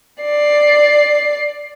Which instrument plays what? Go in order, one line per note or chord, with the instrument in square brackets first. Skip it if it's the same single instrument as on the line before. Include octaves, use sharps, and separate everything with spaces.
[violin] D5 C7